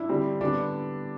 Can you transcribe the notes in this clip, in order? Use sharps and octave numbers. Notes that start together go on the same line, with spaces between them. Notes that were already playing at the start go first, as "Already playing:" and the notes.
Already playing: D4 E4
D3 G3 C4
D3 G3 B3 D4